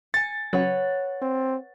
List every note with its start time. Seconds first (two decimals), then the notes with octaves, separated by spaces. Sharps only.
0.14 G#5 A6 C#7
0.53 C#3 F#3 B4 C#5 F#5
1.22 C4